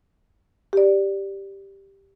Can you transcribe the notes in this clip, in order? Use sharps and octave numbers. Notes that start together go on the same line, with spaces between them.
G4 D5